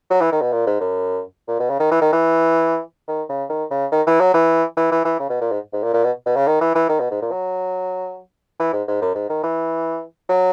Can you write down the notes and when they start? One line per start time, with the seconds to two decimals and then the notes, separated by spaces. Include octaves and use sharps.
0.10 F#3
0.21 E3
0.32 D#3
0.42 B2
0.52 A#2
0.66 G#2
0.81 F#2
1.48 A#2
1.59 B2
1.70 C#3
1.80 D#3
1.91 E3
2.01 D#3
2.13 E3
3.08 D#3
3.29 C#3
3.49 D#3
3.71 C#3
3.92 D#3
4.07 E3
4.20 F#3
4.34 E3
4.77 E3
4.92 E3
5.05 E3
5.20 C#3
5.30 B2
5.41 A#2
5.51 G#2
5.73 G#2
5.83 A#2
5.93 A#2
6.04 B2
6.26 B2
6.36 C#3
6.47 D#3
6.61 E3
6.75 E3
6.89 D#3
7.00 B2
7.11 G#2
7.22 A#2
7.31 F#3
8.59 E3
8.73 G#2
8.88 G#2
9.02 F#2
9.15 G#2
9.29 D#3
9.43 E3
10.29 F#3